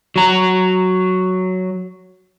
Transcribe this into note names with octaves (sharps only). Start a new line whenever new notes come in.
F#3 A#5